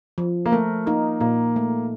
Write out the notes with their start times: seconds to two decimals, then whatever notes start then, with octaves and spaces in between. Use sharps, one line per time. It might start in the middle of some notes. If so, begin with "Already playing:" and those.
0.18 F3
0.46 A#3
0.52 A3 A#4
0.86 A#3 D#4
1.21 A#2 A#3
1.56 A3